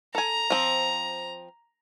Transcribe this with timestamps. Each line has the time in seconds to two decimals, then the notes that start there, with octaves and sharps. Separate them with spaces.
0.15 A4 G#5 A#5
0.50 F3 C4